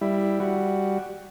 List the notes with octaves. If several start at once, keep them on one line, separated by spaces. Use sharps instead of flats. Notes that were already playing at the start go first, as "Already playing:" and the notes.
G3 E4
G3 F#4